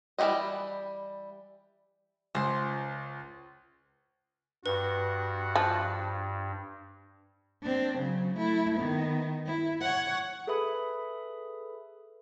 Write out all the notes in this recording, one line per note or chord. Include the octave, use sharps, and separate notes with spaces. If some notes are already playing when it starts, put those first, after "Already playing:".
E3 G3 E4 G4 D#5
C#2 C5 C6
G2 F#4 B4
F3
C4 D4
C#3 F#3
A3 E4
D#3 B3
E4
C#5 F#5
G#4 A4 B4 E5 B5 D#6